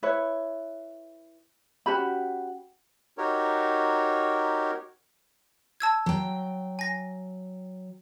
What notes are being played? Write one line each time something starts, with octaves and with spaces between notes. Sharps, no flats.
E4 B4 C#5
C#4 F#4 G4 B5
D#4 F#4 G4 A#4 C#5
A5 E6 G#6
F#3 G5
G#5 A#6